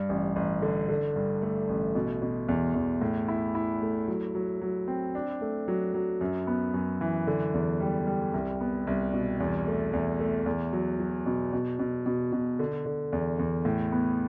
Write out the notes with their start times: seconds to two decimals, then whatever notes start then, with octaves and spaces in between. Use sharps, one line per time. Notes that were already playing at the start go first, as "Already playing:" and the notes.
Already playing: G2
0.09 A1
0.36 A1
0.62 D3
0.89 D3
1.16 G2
1.42 A3
1.69 A1
1.95 B2
2.22 B2
2.48 E2
2.75 E2
3.01 A2
3.28 E4
3.55 E4
3.82 A3
4.08 F#3
4.35 F#3
4.61 F#3
4.88 C4
5.15 D4
5.41 A3
5.68 F#3
5.94 F#3
6.21 F#2
6.47 B3
6.74 F#2
7.01 E3
7.27 D3
7.54 E2
7.80 G3
8.07 G3
8.34 C2
8.60 B3
8.87 C2
9.13 B2
9.40 E2
9.67 A3
9.93 E2
10.20 A3
10.46 E2
10.73 F#3
11.00 F#3
11.26 B2
11.53 B2
11.79 B2
12.06 B2
12.32 B2
12.59 D3
12.86 D3
13.13 E2
13.39 E2
13.65 A2
13.92 B3